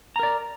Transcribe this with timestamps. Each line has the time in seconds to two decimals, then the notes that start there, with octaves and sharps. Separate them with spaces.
0.16 A#5
0.19 A#4
0.23 D5